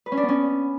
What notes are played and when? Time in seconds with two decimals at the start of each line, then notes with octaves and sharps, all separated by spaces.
0.06 B4
0.12 C#4
0.17 D4
0.23 B3
0.28 C#4